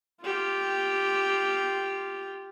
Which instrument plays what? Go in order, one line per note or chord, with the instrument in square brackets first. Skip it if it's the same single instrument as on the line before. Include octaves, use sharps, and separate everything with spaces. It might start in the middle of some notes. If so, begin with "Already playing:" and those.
[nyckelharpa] F4 G4